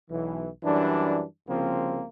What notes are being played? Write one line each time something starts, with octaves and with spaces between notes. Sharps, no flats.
B1 E3
F#2 E3 G3 D4
C2 C#3 F3 A#3 C4